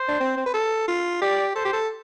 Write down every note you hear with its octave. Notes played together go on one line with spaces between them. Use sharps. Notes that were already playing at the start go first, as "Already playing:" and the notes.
Already playing: C5
D4
C4
C4
B4
A4
F4
G4 D5
A4 C5
G4
A4